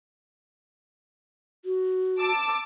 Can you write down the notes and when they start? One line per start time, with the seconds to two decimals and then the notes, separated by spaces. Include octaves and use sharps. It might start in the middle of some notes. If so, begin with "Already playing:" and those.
1.65 F#4
2.19 A5 D6 E6